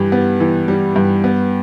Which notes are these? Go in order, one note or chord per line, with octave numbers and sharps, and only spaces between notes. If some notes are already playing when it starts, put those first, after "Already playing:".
Already playing: G2 E3 G3
B3
E3
G3
G2
B3